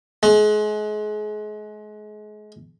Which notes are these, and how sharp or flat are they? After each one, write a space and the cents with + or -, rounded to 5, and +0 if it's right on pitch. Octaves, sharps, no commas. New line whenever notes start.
G#3 +30